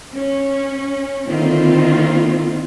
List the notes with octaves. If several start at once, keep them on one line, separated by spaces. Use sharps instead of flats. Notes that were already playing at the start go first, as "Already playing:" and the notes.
C#4
D3 D#3 A#3 C4 E4 F4